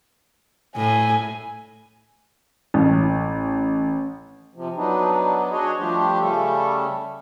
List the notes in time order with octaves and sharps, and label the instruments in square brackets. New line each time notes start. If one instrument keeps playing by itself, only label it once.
[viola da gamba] A2 [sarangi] G#5
[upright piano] A1
[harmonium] C3 F3
F#3 B3 D4 D#4
D4 F#4 G#4 C#5 D#5
F3 G3 A3 D4 G4 C5
C#3 G3 A3 C#4 A4